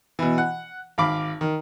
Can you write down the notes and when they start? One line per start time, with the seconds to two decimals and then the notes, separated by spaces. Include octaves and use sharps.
0.19 B2 E3
0.38 F#5
0.98 G#1 F5 B5 D6
1.41 D#3